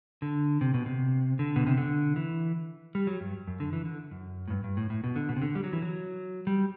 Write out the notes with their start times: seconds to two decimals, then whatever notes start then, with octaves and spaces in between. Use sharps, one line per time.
0.22 D3
0.61 C3
0.74 B2
0.86 C3
1.39 D3
1.56 B2
1.67 C3
1.78 D3
2.16 E3
2.95 G3
3.07 F#3
3.21 G2
3.47 F#2
3.60 D3
3.73 E3
3.85 D3
4.11 F#2
4.48 A2
4.50 G2
4.64 G2
4.77 A2
4.90 A2
5.04 B2
5.16 D3
5.29 B2
5.36 C3
5.42 D3
5.55 G3
5.64 F#3
5.73 E3
5.82 F#3
6.47 G3